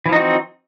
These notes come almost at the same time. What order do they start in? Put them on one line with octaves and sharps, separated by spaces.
E3 F3 D#4 F#4 C4